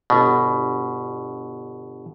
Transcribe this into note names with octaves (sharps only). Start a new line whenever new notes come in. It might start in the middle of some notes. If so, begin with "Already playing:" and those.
G1 B2